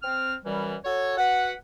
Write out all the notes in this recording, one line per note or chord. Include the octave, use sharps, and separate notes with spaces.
C4 F6
F#2 E3 G3
F#4 A4 C#5
F#4 B4 F#5